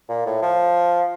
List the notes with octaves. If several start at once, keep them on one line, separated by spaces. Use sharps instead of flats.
A#2
A2
F3